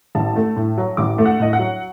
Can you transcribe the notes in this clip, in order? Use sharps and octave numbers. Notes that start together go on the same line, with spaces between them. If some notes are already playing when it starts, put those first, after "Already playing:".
A1 A5
A3
A2
F#3
A1 D6
A3
F#5
A2 D#5
F#5
F#3